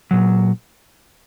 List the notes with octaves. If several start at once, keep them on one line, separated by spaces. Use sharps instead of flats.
A#2 F#3